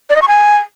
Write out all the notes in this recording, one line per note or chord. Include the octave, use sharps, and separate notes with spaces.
D5
D#5
C#6
G#5